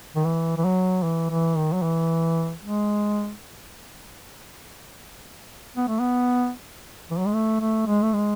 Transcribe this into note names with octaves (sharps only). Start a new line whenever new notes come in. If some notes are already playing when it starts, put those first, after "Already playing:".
D#3
E3
E3
F#3
E3
E3
D#3
F#3
E3
G#3
B3
A3
B3
E3
F#3
G#3
A3
A3
G#3
A3
G#3